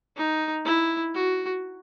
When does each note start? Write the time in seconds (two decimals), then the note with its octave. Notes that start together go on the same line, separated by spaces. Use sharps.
0.17 D#4
0.65 E4
1.14 F#4